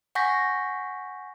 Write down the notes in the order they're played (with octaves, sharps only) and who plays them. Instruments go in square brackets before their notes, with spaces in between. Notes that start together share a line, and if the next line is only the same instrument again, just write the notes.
[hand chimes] F#5 G#5 C#6 G6 A#6 B6